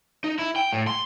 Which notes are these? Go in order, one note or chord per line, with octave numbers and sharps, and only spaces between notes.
D#4
E4
G5
A2
C6